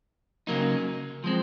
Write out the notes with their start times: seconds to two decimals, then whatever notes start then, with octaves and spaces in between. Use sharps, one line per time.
0.47 C#3 F#3 A#3 D#4
1.24 F3 G#3 C4